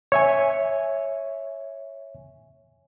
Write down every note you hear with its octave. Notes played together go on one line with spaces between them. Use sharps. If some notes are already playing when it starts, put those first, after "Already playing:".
C#5 E5 G#5